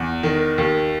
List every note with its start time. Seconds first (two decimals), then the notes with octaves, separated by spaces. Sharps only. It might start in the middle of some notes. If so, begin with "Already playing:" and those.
Already playing: E2
0.23 D#3
0.58 D#2